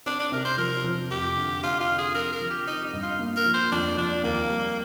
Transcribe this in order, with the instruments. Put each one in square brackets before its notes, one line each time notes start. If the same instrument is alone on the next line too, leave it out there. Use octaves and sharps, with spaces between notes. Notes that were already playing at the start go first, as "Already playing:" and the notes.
[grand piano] C4 [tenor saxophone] D4
[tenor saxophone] D4
[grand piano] C3 [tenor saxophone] A#4
[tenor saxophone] C5
[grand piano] F3 [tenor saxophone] A#4
[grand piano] F3
[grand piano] F1 [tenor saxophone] G4
[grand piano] D3
[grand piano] F2 [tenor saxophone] F4
[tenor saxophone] F4
[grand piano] D3
[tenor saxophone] G#4
[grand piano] F3 [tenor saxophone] A#4
[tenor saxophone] A#4
[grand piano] F3
[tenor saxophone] G4
[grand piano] C4 [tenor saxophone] D#4
[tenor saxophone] D#4
[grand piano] G2
[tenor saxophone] F4
[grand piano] A#3
[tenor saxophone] A#4
[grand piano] F3
[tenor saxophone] C5
[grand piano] F2 [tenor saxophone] D4
[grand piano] F3 [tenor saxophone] D4
[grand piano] D#2 [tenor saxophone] A#3
[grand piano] G3